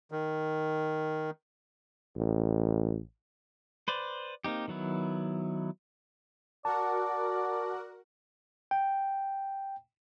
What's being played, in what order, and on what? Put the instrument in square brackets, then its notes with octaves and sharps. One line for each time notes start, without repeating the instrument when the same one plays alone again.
[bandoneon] D#3
[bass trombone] A1
[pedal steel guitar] B4 C5 D5
A#3 C4 D#4 G4
D#3 F#3 B3 E4
[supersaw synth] F#4 A#4 F#5 [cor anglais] D5 [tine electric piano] A5
[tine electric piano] G5